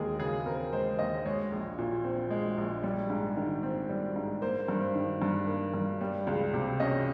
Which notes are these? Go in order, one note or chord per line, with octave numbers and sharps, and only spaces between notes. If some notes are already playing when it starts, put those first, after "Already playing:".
Already playing: D#2 G#3 G#4 A#4
C#3 G#4
C4 A#4
G#3 C5
D#2 D#5
G#3 C#5
A#1
A#2
C4
G#3
A#1
G3
G#2
D#3
C4
G3
G#2
A#3 C5
G2
C5
D#3
G2
A#3
G2
G3
C#2
C3
C#4 D#5